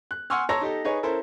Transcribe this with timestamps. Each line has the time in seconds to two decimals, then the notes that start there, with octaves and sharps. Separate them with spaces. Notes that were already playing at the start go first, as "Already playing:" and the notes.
0.11 F#6
0.30 F#5 G#5 C6 C#6 E6 F6
0.49 C#5 A5 A#5 C6 E6 A#6
0.61 D#4 G4 A4
0.84 D#4 G#4 B4 C#5
1.03 C#4 E4 A4 A#4 C5